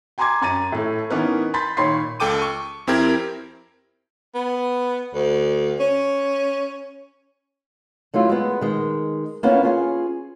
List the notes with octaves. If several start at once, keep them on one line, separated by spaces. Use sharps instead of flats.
G5 G#5 A#5 C6 D6 G#6
F#2 A#5 A6 D#7
A2 A3
E3 B3 C#4 D#4 A#4 B4
B5 C6 G6 A6 B6
A#2 D#3 C#5 B5 C6 C7
C#2 A4 G5 D6 D#7
C#6
F2 C4 E4 G4 A#4 G#6
B3
D2
C#4
F#3 A3 E4 F4
G#3 B3
D#3 G#3
A#3 B3 C#4 E4 F4
C#4 F4 G#4